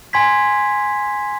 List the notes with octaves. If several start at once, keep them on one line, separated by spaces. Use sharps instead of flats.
G#5 C6 G#6 B6